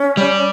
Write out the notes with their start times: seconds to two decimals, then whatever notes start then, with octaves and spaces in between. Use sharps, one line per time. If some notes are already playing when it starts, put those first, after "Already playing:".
Already playing: C#4
0.17 G3